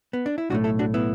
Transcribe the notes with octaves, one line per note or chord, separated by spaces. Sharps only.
B3
D4
E4
B1 A2 A3 D4 F#4
E4 A4
D4 F#4
B3 E4